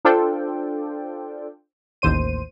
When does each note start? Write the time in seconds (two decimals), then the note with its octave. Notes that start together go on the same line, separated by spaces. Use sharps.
0.05 D4 F4 A4 C5 D5 G5
2.02 A1 D#2 C5 D#7